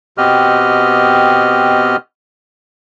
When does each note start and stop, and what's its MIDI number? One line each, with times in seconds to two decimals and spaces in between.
0.18 1.96 47
0.18 1.96 59
0.18 1.96 60
0.18 1.96 67
0.18 1.96 75
0.18 1.96 89